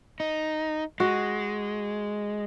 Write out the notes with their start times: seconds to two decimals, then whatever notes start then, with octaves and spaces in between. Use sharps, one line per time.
0.20 D#4
1.00 G#3 F#4